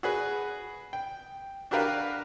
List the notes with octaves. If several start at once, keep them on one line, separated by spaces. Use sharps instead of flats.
F#4 G#4 B4
G5
D4 F#4 G4 A#4 B4 F5